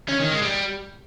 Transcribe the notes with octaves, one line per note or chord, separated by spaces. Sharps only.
C#4
D#3
G#3
G3